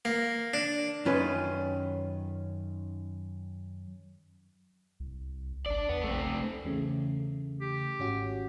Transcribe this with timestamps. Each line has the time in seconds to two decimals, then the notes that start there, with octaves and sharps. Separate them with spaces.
0.05 A#3
0.54 D4
1.05 F#2 D#3 C#4 F4 B4
5.00 C2
5.66 G#1 D4 D5
5.89 E2 B3
6.04 A#1 A3 C4
6.65 E2 C#3 A3
7.61 G4
7.99 G#1 C#4 F#4